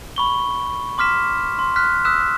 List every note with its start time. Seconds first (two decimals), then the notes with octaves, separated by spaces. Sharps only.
0.16 B5 C#6 G7
0.98 C6 D6 F6 B6 E7
1.59 C6
1.76 F6 F#6 B6
2.05 D#6 E6 F#6 B6 E7